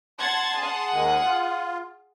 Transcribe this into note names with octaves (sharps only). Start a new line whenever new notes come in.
F#5 A5 C6 G#6 A6
G#4 F#5
D#2 D#3 G#3
F4